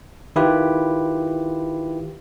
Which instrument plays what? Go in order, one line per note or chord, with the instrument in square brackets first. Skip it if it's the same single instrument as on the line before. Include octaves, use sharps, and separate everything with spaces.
[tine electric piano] D#3 E4 F4 G4 B4